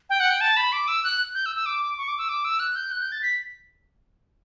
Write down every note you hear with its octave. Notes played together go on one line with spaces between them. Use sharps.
G5
F#5
G5
A5
B5
D6
E6
F#6
G6
E6
E6
D6
C#6
D6
E6
D6
E6
F#6
G6
F#6
G6
A6
B6